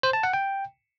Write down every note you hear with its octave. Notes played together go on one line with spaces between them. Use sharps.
C5
A5
F#5
G5